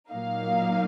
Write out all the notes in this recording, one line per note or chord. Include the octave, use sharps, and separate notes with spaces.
A#2 F#3 A#3 D#4 F5